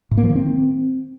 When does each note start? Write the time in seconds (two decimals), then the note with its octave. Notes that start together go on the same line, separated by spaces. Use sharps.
0.11 A2
0.17 A#3
0.24 F3
0.30 D#3
0.36 C4